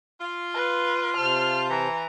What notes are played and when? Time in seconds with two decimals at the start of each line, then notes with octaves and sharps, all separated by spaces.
0.20 F4
0.54 B4
1.17 C3 C5 A5 F6
1.70 E3 A#5